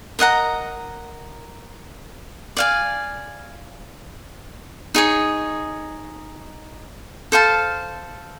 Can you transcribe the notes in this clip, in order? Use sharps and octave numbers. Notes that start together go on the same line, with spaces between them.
A#4 D#5 F#5 A#5
D5 F5 G#5
D#4 G#4 C#5
A4 C5 F5 A5